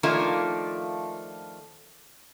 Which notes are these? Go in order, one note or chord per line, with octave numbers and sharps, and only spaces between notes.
D#3 F3 A3 A#3 D4 F4